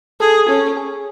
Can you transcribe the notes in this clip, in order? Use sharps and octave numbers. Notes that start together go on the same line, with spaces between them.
G#4 A4
C#4 A4
G#4